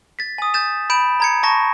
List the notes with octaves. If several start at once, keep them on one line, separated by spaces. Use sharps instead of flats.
A6 B6
G#5 D#6
G6 A6 E7
B5 G6 D7 E7
A#5 G#6 C#7
A5 C#6 A#6